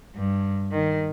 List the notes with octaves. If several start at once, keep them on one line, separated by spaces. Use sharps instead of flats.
G2
D#3